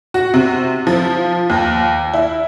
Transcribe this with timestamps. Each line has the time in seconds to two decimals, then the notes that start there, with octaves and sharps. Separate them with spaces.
0.14 F#4
0.34 C3
0.87 F3
1.50 D#2
2.14 E4